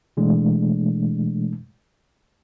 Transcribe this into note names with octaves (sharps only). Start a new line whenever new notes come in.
B2 E3 G#3 A3 D4